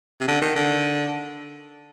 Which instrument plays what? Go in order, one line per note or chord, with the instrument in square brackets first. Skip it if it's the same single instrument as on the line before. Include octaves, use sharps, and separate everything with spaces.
[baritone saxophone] C3
D3
D#3
D3